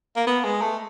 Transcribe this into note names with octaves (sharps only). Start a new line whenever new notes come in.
A#3
B3
G#3
A3